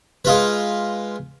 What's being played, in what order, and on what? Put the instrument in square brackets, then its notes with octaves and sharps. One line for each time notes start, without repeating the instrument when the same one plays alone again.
[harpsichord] G#3 F4 B4